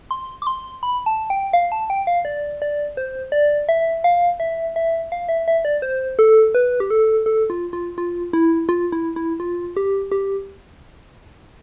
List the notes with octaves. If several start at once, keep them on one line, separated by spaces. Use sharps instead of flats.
C6
D6
C6
B5
A5
G5
F5
A5
G5
F5
D5
D5
C5
D5
E5
F5
E5
E5
F5
E5
E5
D5
C5
A4
B4
G4
A4
A4
F4
F4
F4
E4
F4
E4
E4
F4
G4
G4